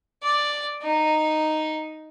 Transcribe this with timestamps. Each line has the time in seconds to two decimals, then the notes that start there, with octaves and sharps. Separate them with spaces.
0.23 D5
0.83 D#4